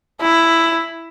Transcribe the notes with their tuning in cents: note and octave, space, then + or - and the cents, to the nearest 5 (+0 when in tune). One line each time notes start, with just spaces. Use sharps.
E4 +5